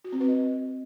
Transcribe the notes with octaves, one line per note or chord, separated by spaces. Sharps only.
F#4
C4
B4
D#5